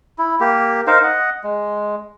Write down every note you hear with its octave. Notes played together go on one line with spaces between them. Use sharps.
E4
A#3 G4
D#4 A#4 C5 F5
D#5 F#5
G#3